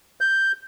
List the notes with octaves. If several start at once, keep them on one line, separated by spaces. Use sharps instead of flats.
G6